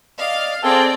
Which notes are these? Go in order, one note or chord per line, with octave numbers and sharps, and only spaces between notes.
D5 D#5 F5
C4 G#4 A4 D5 G5